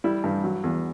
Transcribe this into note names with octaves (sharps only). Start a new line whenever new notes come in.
G3 E4
G2
F#3
E2